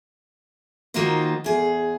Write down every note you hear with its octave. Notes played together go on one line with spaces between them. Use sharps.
D#3 A#3 D#4 F4 F#4 C5
E2 G#4